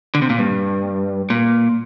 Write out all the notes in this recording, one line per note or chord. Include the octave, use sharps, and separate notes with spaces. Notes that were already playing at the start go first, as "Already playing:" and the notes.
D3
C3
A#2
G2
A#2